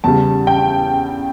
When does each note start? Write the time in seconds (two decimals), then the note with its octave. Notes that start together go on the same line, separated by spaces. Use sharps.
0.04 E2 C#3 G3 A5
0.47 G5